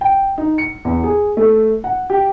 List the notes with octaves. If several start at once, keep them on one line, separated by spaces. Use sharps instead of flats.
G5
D#4
C#7
E2
G#4
A3
F#5
G4